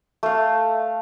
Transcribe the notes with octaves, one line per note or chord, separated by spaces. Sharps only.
A3 F5